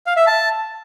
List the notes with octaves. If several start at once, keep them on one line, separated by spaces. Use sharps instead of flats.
F5
E5
A5